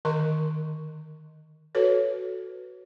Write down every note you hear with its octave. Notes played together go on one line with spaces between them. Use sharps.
D3 D#3 A#4 D#5 C6 C#6
F#4 A4 B4 C#5